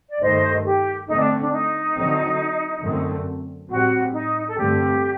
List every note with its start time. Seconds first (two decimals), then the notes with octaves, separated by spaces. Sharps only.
0.10 D5
0.21 G2 D#3 A3 C5 D#5
0.65 G4
1.08 D3 A3 C4 D#4
1.19 D4
1.41 D4
1.52 D#4
1.96 D3 F#3 C4
2.82 F#2 D3 A3 C4
3.68 A2 G3 C4 F#4
4.13 D#4
4.47 A4
4.56 G2 D3 A3 C4 G4